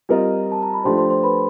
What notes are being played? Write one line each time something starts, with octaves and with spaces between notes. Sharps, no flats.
G3 C4 F4 A#4 D#5
A5
A#5
B5
F3 A3 D4 G4 C5 C6
C5 C6
C5 C6
B4 B5